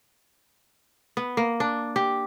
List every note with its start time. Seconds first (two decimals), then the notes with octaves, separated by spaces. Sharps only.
1.17 B3
1.37 A#3
1.60 D4
1.96 G4